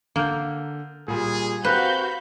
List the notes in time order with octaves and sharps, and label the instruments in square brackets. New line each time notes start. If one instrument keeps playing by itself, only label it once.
[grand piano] D3 F6 G6 [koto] A#3
[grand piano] A#2 G3 [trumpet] G#4
[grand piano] C4 G4 A#4 [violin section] F#4 F5 G6 [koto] B4 [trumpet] B5